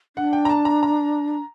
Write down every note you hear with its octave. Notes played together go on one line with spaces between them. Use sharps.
D4 F#5
G5
A#5
A5
A#5
A#5